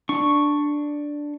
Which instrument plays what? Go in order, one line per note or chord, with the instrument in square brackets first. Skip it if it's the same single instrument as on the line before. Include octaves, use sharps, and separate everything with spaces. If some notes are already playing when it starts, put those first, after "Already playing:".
[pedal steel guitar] D4 C#6